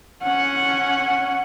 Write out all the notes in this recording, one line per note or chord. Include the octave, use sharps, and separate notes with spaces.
C#4 F#5